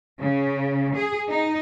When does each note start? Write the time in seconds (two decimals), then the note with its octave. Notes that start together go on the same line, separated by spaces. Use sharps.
0.20 C#3
0.96 G#4
1.29 D#4